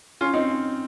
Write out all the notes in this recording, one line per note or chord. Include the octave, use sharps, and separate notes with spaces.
C#4 F4
C4 D#4